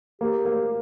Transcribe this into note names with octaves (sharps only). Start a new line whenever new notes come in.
A#3 G4
A#3